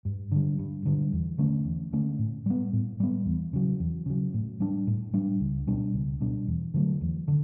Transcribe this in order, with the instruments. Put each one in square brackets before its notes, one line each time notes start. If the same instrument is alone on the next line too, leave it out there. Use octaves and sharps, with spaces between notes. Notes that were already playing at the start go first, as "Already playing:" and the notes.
[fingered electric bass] G2
D3 G3
G2
D3 G3
E2
D3 A3 C#4
E2
D3 A3 C#4
A2
G3 B3
A2
G3 B3
E2
C#3 F#3
E2
C#3 F#3
A2
G3 D4
A2
G3 D4
C#2
B2 G3 D4
C#2
B2 G3 D4
E2
D3 F#3 A3
E2
D3